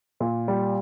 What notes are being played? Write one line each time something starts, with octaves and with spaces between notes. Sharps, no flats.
A#2
G3